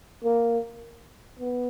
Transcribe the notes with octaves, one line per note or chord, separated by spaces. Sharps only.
A#3
B3